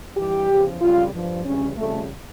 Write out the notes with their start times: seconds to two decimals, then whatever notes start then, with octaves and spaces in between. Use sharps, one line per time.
0.17 G2 E3 G3 G4
0.49 E2 C#3 F3
0.81 F2 C#3 G3 F4
1.13 G2 F3
1.45 D2 C#3 E3 G3 C#4
1.77 F2 C#3 G3 A3